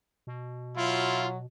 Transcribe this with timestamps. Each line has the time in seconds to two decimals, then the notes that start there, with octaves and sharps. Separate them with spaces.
0.27 B2
0.77 F#3 E4 F4